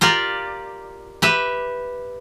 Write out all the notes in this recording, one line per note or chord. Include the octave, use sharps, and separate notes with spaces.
F4 G4 A#4 D5
G4 B4 E5